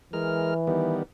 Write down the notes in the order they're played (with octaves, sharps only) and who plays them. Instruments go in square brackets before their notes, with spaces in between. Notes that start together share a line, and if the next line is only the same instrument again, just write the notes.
[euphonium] E3 [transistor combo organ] G#3 A#4 F6
[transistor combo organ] D#3 G3 B3